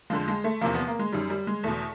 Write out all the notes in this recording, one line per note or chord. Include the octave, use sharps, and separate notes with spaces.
F2 D3 F3 G#3
G#3
A3
E2 C3 F3 A#3
B3
A#3
G#3
F#2 D#3 G3
G3
G#3
E2 B2 A3